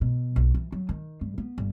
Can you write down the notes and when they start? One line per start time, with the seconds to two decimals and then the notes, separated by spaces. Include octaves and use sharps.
0.01 B2
0.36 B1
0.54 E3
0.72 F#3
0.89 D#3
1.21 G2
1.38 B3
1.58 G1